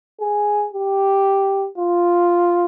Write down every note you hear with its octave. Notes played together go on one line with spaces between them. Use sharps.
G#4
G4
F4